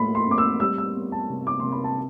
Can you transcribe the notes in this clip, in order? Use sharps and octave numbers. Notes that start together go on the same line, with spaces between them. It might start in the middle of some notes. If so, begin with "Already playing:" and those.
Already playing: A2 F3 A3 B5 C6
C6
C4 D6
E6
G3 E6
E6
B3
A5
C3
D6
C3 C6
B5
A5